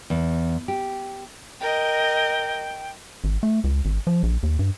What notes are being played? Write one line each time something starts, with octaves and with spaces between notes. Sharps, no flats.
E2
G4
A#4 D#5 G5
G#1
A3
C#2
G#1
F3
A#1
D#2
G2